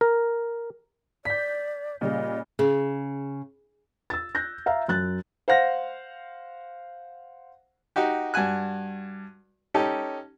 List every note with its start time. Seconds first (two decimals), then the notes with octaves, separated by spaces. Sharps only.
0.01 A#4
1.25 D5 G6 B6
2.01 A#2 C#3 G3 D#5
2.59 C#3 G#4
4.10 E6 A6
4.35 F#6 G6 A#6
4.66 E5 F5 A#5
4.88 F#2 F#6 A6
5.48 C5 F5 F#5 A#6
7.96 D#4 F#4 G4
8.34 G2 F#4 G#5 F#6
9.74 C#4 D#4 G4 A4